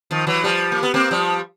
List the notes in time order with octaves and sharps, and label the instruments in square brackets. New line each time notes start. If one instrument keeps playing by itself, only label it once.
[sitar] D#3 F3
E3 F#3
F3 G3
A#3
B3
A#3 C4
F3 G3